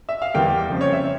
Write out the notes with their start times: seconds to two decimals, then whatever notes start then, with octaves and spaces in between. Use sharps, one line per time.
0.09 E5
0.22 F5
0.34 E2 E3 G3 A#3 G5
0.70 F2 C#3 F3
0.81 C#5
0.93 E5